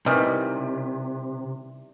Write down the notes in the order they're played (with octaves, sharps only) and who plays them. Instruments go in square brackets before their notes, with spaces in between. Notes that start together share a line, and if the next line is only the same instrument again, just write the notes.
[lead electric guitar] C3 [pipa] D#3 E3 G3